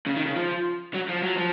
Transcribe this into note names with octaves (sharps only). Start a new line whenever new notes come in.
C#3
D#3
C#3
F3
F#3
F3
F#3
F3